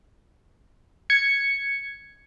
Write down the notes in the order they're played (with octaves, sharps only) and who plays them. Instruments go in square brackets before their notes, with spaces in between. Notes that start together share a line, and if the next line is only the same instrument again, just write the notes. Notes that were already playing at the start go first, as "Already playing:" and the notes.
[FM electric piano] G#6 C#7